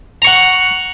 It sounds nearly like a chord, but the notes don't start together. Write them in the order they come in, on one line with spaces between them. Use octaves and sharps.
A#5 C#6 F#5